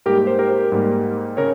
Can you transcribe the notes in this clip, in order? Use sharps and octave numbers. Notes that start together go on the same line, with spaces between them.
G#2 G3 A#3 G4 A#4
C5
G4 A#4
G#2 G3 A#3
C#3 A#4 C#5